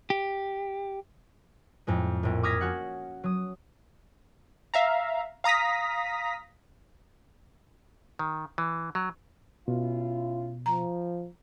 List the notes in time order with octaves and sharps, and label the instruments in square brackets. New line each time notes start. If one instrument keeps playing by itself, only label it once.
[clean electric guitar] G4
[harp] F2 A2 G#3
A#1 A2
D6 D#6 F6 G#6 A#6 B6
C#4 F#4 F#5
F#3 D#6
[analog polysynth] E5 F5 A#5
F5 A#5 D#6 A#6 B6
[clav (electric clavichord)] D#3
E3
F#3
[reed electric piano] B2 [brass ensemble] C#4 E4 F4
[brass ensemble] F3 [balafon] A#5